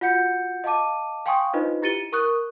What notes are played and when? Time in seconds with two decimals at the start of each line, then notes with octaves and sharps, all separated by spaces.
0.01 F4 F#4 F#5 G6 C#7
0.64 D#5 F5 A5 D6 D#7
1.26 F5 G5 G#5 C6 C#6 D#6
1.53 D4 D#4 F4 B4 C5 D#5
1.82 E4 G4 A6 C#7 D#7 G7
2.12 A#4 C#6 D#6 F#6